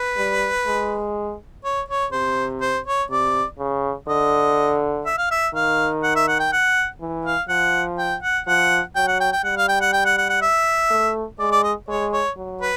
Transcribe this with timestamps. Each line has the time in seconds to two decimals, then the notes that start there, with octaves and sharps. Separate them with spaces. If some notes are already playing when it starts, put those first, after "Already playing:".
Already playing: B4
0.17 G3
0.66 G#3
1.64 C#5
1.88 C#5
2.12 C3 C5
2.61 C5
2.86 C#5
3.10 C3 D5
3.59 C#3
4.08 D3 D#5
5.05 E5
5.18 F5
5.31 E5
5.54 D#3 F5
6.03 F#5
6.16 E5
6.28 F#5
6.39 G5
6.52 F#5
7.01 E3
7.25 F5
7.49 F3 F#5
7.98 G5
8.22 F#5
8.47 F3 F#5
8.96 F#3 G5
9.08 F#5
9.20 G5
9.33 G5
9.44 G3 F#5
9.57 F5
9.68 G5
9.81 F#5
9.93 G5
10.05 F#5
10.17 F#5
10.29 F#5
10.42 E5
10.90 A3
11.39 G#3 D5
11.52 D5
11.63 D#5
11.88 G#3 C#5
12.13 C#5
12.36 F#3
12.61 B4